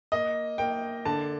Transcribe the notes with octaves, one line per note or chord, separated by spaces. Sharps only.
A#3 D#5
A#3 G5
D3 A5